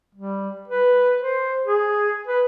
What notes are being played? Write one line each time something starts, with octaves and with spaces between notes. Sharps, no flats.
G3
B4
C5
G#4
B4